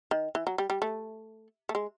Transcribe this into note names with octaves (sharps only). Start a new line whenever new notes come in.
D#3
E3
F#3
G3
G3
A3
A3
G#3